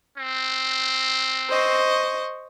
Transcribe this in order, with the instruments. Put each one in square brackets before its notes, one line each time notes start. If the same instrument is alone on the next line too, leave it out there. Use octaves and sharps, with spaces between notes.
[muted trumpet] C4
[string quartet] C5 D#5 C#6